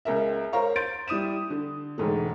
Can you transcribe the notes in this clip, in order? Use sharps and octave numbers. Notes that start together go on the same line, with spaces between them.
C#2 A#4 E5
A#4 C5 C#5 F5 A#5 C#6
C6 G6 A6 D7
G3 E4 D#6 D#7 E7
D3
E1 G#2 A3